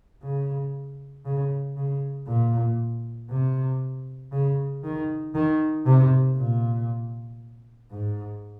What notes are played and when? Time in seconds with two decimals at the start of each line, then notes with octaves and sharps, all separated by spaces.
0.23 C#3
1.25 C#3
1.77 C#3
2.28 A#2
3.30 C3
4.32 C#3
4.84 D#3
5.35 D#3
5.86 C3
6.37 A#2
7.91 G#2